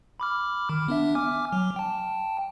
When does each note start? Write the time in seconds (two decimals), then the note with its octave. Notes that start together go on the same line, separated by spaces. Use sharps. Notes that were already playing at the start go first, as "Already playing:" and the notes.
0.20 B5 D6 F6
0.69 D#3
0.88 B3 D4 E5
1.15 G#5 D6 F6
1.52 F#3
1.76 G5 A5